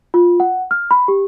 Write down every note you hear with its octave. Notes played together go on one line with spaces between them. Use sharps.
F4
F#5
F6
B5
G4